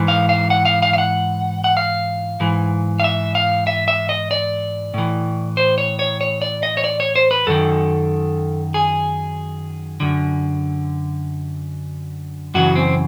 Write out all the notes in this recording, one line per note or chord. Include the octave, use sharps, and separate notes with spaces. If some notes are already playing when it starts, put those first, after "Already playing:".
Already playing: G#2 E3
F5
F5
F#5
F5
F5
F5
F#5
F#5
F5
G#2 E3
F5
E5
F5
E5
E5
D#5
D5
A2 E3
C5
C#5
C#5
C#5
D5
D#5
C#5
D5
C#5
C5
B4
F#2 D#3 A4
G#4
F#2 D3
F#2 C#3 E3 F#4
C4